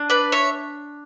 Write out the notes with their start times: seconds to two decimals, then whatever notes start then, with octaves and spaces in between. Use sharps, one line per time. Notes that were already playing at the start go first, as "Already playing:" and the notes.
Already playing: D4
0.10 B4 D5
0.32 C#5 E5